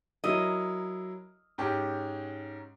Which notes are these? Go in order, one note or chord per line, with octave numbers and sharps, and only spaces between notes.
F#3 E4 A#4 D#5
G#2 C#4 G4